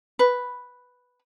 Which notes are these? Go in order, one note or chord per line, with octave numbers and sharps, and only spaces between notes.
B4